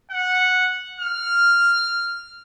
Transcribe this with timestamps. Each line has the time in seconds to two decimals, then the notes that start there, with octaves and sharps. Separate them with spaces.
0.11 F#5
1.00 F6